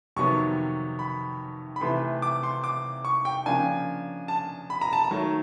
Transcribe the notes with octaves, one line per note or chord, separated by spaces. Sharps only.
F2 C3 D#3 F#3 B3 C#6
B5
B5
C3 E3 A3 C6
D6
C6
D6
C#6
G5
C#3 F3 A#3 D4 G#5
A5
B5
A#5
A5
A#5
D#3 F#3 A3